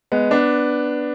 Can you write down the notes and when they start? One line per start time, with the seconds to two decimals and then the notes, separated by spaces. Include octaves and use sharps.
0.12 G#3 B3
0.31 B3 D4